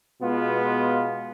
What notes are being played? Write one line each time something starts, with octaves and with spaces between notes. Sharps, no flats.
B2 G#3 B3 F4